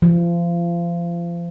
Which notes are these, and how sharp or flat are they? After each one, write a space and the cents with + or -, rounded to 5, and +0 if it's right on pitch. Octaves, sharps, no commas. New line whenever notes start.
F3 -30